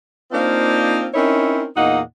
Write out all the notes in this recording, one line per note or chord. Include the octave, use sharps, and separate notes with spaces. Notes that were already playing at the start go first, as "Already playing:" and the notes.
A#3 C4 D4 D#4 F4 C5
C4 C#4 D#4 E4 A#4 C#5
E2 A#2 A#3 D#4 D#5 F#5